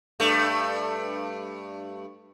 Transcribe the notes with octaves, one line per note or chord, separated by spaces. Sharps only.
G2 A3